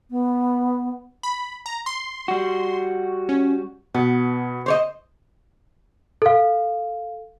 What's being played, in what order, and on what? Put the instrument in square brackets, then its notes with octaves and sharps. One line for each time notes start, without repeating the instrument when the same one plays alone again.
[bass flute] B3
[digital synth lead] B5
A#5
C6
[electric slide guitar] G3 F#4
[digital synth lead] C#4
[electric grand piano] B2 [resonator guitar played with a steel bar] B3
[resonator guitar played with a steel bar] C5 C#5 D#5
[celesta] A4 F5